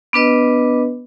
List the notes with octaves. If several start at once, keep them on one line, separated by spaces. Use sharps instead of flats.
B3 D4 B4 D#5